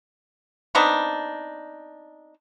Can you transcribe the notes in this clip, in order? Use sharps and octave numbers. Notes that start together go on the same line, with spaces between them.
B3 C4 D4 D#4